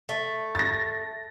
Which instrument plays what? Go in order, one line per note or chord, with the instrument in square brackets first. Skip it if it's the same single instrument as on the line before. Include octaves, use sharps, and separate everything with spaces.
[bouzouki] A3
[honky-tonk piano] A6 A#6